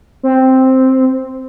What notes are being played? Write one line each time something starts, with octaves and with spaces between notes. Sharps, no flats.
C4